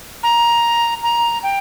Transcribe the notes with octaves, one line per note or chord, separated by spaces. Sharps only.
A#5
A#5
G5